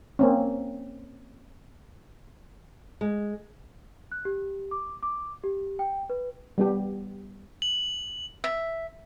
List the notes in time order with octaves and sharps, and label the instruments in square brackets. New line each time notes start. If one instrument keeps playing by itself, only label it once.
[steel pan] A#3 C4 C#4
[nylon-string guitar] G#3
[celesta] F#6
G4
D6
D6
G4
G5
B4
[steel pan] G3 B3 G4
[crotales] F#7
[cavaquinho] E5